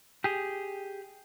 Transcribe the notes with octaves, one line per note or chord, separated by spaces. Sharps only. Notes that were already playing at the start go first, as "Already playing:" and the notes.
G4 G#4